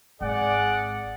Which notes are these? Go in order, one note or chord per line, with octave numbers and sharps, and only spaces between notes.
G#1 G#4 D5 F#5